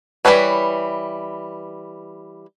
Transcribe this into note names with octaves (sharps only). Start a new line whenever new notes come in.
E3 G3 B3 B4 C#5